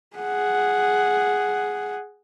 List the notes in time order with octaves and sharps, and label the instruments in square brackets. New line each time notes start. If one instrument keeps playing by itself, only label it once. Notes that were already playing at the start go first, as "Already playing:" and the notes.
[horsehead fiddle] G#4 F#5